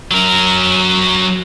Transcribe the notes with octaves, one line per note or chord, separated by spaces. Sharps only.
F#3 A#4